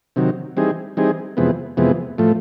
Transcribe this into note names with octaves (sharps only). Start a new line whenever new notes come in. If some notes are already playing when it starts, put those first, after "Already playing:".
C3 D#3 F#3
E3 G3 C4 D#4 G#4
E3 G3 C4 D#4 G#4
F2 C3 E3 G#3 B3
F2 C3 E3 G#3 B3
A2 F3 A3